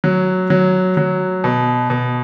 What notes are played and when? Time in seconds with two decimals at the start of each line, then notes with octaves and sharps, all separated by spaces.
0.04 F#3
0.50 F#3
0.97 F#3
1.44 B2
1.90 B2